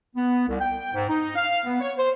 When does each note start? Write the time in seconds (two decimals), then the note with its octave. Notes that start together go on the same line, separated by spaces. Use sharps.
0.16 B3
0.46 C2
0.60 G5
0.93 G#2
1.09 D#4
1.35 F5
1.66 B3
1.81 C#5
1.97 C5